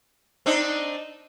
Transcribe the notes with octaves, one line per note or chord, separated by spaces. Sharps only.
C4 D4 D#4